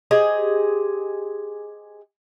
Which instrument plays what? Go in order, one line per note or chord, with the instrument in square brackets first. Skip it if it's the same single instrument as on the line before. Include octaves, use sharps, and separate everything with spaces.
[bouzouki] G4 G#4 C5 D#5